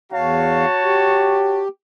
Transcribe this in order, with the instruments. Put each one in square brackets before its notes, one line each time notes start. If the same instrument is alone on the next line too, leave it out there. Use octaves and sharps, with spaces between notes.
[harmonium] E2 F5 [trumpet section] F#4 C#5 A5
[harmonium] G4